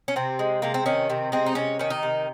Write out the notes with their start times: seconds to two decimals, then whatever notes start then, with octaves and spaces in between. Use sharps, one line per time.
0.08 C#4
0.16 C3 C4
0.39 G#3
0.62 C3 A#3
0.74 C4
0.86 D#3 C#4
1.09 C3 C4
1.32 G#3 C4
1.46 D#4
1.55 C3 C#4
1.79 D#3 C#4
1.90 D#4
2.03 C3